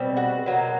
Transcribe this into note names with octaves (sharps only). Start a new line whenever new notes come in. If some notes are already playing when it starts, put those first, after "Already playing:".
Already playing: B2 G3 C4
F#4 F#5
B2 F#3 A#3